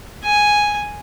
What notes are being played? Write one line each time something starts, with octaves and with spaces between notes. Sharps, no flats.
G#5